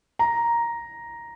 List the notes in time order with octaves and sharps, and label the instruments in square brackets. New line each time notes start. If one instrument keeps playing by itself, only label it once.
[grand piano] A#5